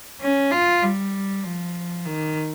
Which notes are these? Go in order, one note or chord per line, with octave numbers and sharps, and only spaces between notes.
C#4
F4
G3
F3
D#3